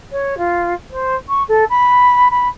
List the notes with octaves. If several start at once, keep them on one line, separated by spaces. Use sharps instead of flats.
C#5
F4
C5
C#6
A4
B5
B5